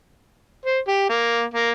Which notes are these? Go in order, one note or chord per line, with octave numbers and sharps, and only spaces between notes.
C5
G4
A#3
A#3